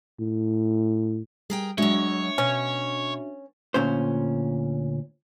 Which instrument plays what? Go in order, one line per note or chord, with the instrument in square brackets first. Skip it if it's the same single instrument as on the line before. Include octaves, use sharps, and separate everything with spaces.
[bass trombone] A2
[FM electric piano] G3 [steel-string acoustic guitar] G#4 A#4 G5
[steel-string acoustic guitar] F#3 G#3 [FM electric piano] D4 F#4 E5 [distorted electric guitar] C#5
[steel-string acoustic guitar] B2 [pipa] C#4
[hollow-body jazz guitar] D2 A#2 C#4 C5